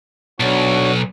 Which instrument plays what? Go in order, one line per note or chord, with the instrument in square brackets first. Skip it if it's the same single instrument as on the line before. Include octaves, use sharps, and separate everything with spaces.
[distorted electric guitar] B1 [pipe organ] D4 F#4 C#5